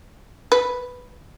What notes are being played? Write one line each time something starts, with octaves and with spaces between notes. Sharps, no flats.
B4